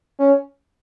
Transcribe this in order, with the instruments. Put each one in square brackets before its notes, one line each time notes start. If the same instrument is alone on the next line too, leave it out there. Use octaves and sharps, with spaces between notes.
[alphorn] C#4